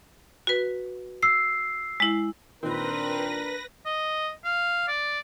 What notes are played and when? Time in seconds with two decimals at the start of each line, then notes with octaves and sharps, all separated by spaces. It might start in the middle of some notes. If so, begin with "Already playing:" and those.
0.47 F#4 B4
1.23 E6 C7
2.00 G#3 E4
2.63 A#2 D#3 C4 D4 A#4 B4 A#6
3.86 D#5
4.44 F5
4.88 D5